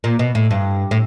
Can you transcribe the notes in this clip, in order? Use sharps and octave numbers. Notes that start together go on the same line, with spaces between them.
A#2
B2
A2
G2
A2